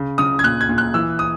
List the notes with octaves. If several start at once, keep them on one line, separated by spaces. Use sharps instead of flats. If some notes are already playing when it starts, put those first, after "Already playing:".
Already playing: C#3
C#3 D#6
G#6
A#2 F#6
G#6
A#2
F#6
E3 E6
D#6